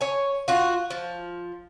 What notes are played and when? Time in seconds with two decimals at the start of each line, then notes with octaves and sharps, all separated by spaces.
0.01 C#5 G#5
0.48 F4 F#4
0.90 F3